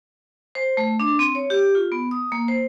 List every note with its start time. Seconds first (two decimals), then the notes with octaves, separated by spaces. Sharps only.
0.55 C5
0.77 A3
1.00 D4
1.19 C4
1.35 C#5
1.50 G4
1.75 F4
1.92 B3
2.11 D#6
2.32 A#3
2.48 C5